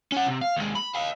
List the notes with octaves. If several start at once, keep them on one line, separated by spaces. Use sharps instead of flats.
C#4 F#5
C3
F5
D#2 G#3
B5
D#5 F5